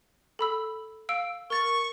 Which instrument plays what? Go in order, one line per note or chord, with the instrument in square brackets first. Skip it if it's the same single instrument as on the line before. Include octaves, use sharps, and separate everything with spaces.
[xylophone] A4 B5 E6
F5 E6 D7
[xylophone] A#4 A6 [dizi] C#6